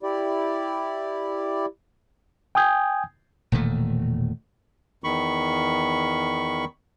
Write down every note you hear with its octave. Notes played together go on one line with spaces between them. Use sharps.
E4 G4 D5
G5 G#5 D#6 G6 G#6
E1 A#2 D#3 A3
E2 D#3 B5 C#6